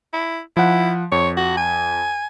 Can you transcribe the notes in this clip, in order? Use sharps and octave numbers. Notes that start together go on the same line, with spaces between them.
E4
F3 E4 F#5
F2 C#5
F#4
G#5